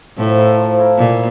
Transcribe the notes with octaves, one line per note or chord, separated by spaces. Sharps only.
A2 F3
A3 E4 A#4
F3
A3 E4 A#4
A#2 A#3